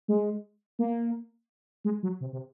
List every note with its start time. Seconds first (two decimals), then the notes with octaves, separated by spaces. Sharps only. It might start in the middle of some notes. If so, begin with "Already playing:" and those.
0.08 G#3
0.79 A#3
1.85 G#3
2.03 F#3
2.21 C3
2.33 C3